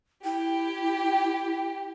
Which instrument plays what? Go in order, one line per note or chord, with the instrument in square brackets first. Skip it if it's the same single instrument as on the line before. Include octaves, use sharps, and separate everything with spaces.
[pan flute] E4 [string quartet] G4 [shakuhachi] G5